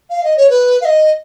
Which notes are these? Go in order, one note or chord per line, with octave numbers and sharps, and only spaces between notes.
F5
D#5
C#5
B4
F5
D#5